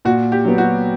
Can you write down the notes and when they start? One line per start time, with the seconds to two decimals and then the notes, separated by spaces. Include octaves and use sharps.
0.05 A#2 F#4
0.32 G4
0.45 F#3 B3
0.58 F#4